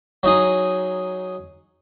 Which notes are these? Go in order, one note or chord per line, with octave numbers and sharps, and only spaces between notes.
F#3 D#4 G#4